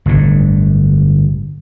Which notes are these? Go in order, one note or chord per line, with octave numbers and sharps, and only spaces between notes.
G1 A2 D3